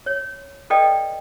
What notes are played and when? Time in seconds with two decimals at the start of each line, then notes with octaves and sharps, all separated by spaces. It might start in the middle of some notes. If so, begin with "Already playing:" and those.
0.06 C#5
0.70 A4 B4 D5 D#5 G5